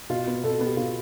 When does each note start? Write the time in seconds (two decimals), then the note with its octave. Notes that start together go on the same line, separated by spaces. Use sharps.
0.10 B2 F4
0.27 B3
0.44 B2 A4
0.54 A4
0.60 B3
0.66 G4
0.77 B2 F4